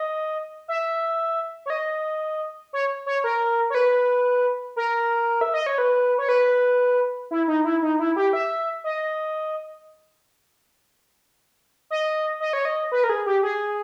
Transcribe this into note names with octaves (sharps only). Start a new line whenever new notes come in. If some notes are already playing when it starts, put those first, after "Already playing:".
Already playing: D#5
E5
C#5
D#5
C#5
C#5
A#4
C#5
B4
A#4
E5
D#5
C#5
B4
C#5
B4
E4
D#4
E4
D#4
E4
G4
E5
D#5
D#5
D#5
C#5
D#5
B4
A#4
G#4
G4
G#4